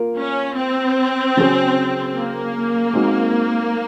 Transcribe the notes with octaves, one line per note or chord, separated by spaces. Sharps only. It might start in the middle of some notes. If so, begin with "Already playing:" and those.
Already playing: A#3 F4 A#4
C#4
C4
C#3 F#3 C#4 G#4
A#3
G#3 C4 D#4 F#4